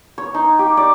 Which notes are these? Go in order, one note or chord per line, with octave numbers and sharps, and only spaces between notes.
C#5
D#4
G4
D5